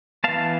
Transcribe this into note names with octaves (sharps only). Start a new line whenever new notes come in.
E3 B3 F5 A5